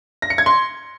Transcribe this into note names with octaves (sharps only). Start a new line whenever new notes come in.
A#6
C#7
G#6
C6